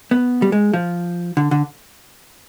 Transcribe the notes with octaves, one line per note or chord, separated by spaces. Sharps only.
B3
G3
G#3
F3
D3
D3